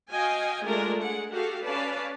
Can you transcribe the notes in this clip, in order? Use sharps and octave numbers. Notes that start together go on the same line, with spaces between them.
F#4 D#5 F5 G5 G#5
G#3 A3 D4 F4 A#4
G#4 F#5
F#4 G4 A4 F5
C#4 B4 D5 F5 A5